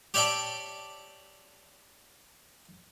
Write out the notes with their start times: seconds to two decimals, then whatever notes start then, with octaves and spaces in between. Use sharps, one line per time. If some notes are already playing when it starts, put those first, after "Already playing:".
0.14 G4 C#5 D5 E5 G5 A5